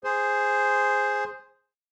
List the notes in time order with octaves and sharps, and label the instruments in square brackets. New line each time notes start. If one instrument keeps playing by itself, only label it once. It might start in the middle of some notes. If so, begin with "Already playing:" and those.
[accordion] G#4 C5